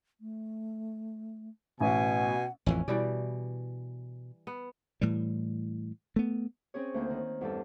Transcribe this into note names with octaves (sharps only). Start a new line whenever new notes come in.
A3
A1 B2 F#5 G#5
A1 F2 E3 C#4
B2 E3 G3 D5
B3
A2 E3 G3
A3 B3
C4 C#4 G#4 C#5
D2 A#3 G6
D#3
E2 G2 A4